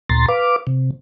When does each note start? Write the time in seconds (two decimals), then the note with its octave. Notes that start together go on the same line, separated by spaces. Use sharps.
0.10 D2 A#2 A#5 C6 A6
0.29 B4 F5 D6
0.67 C3